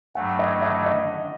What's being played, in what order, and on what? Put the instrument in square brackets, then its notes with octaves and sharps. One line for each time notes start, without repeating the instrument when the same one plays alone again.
[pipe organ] G2 F#3 A3 [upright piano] F#5
[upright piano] D#5
D#5
D#5